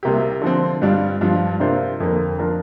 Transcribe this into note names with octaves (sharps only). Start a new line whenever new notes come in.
C2 C3 A#3 G4
D3 F3 C4
G2 G3 D4 F4 D5
G2 F3 D4 F4
C3 A#3 D4 F4 C5
F2 D3 A#3
F3 D4 A#4